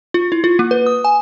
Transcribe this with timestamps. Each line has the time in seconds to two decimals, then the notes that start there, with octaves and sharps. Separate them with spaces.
0.14 F4
0.32 E4
0.44 F4
0.59 A#3
0.71 B4
0.86 D#6
1.04 G#5